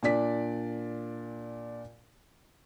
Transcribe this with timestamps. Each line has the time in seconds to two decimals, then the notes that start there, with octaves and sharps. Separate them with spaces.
0.03 A#2 D4 D5 B6